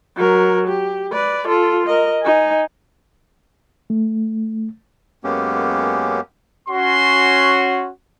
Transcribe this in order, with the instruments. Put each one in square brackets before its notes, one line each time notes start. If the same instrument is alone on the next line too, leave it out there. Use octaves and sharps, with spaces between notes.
[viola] F#3 A#4
G4
B4 D5
F4 A4
A#4 D#5
D#4 G#5
[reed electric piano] A3
[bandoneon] F#2 G#3 A#3 B3 C#4 G4
[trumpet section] C#4 F#4 [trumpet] C6